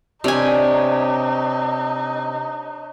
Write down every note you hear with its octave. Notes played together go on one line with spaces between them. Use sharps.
C3 D4 D#4 C#5 G#5